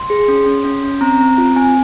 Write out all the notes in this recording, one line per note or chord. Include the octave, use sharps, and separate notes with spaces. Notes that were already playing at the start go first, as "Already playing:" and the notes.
Already playing: C6
G#4
C#4
C#4
C#4
C#4
C4 A#5
C4
F4
C4 G#5